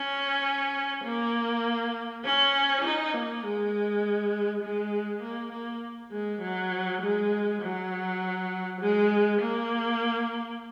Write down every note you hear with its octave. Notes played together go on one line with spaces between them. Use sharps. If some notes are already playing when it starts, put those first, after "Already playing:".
Already playing: C#4
A#3
C#4
D#4
A#3
G#3
G#3
A#3
A#3
G#3
F#3
G#3
F#3
G#3
A#3